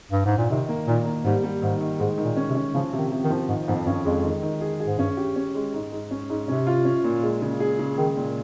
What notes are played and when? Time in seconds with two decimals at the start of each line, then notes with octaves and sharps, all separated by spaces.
0.12 G2
0.25 G#2
0.38 A#2
0.50 C3 D#3
0.69 A#3
0.87 A#2 D#3
1.06 A#3
1.25 G#2 G3
1.44 G3
1.62 G#2 D#3
1.81 D#3
2.00 G#2 G#3
2.18 D#3
2.24 A#2
2.37 C#4
2.49 C3
2.55 C#4
2.74 C#3 F3
2.93 C3
2.99 D#3
3.12 C3
3.24 D#3
3.30 F3
3.48 G#2 D#3
3.68 F2 G#2
3.86 G2 C#4
4.05 F2 G#3
4.24 D#3
4.43 D#3
4.61 G#4
4.80 G#4
4.86 G#2
4.98 G2 C#4
5.17 G4
5.36 C#4
5.55 G#3
5.74 G#2
5.92 G#2
6.11 C#4
6.30 G#2
6.48 C3 C#4
6.67 F4
6.85 C#4
7.04 A#2
7.23 G#3
7.42 C#3
7.60 G#4
7.79 C#3
7.98 D#3 G#3
8.17 A#2